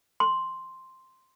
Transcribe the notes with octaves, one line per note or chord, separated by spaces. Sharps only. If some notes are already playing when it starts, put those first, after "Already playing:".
C6